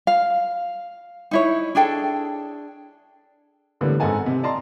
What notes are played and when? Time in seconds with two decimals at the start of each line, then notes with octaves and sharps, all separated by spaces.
0.07 F5
1.31 D#4 E4 C#5
1.75 D4 G#4 A4 G5
3.81 A2 D3 E3 G3 A#3 B3
4.00 G#1 G#2 A4 F#5 G#5 A5
4.26 C3
4.43 D5 D#5 A5 A#5 C6